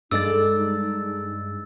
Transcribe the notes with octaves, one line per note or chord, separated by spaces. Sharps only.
G2 G#3 D#4 A4 D5 E6 A6